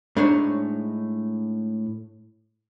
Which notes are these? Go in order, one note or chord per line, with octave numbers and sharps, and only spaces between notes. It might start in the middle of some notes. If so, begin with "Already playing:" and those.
A2 G#3 D4 D#4 C5 C#5